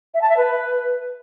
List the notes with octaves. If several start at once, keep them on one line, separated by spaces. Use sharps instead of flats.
E5
A5
E5
B4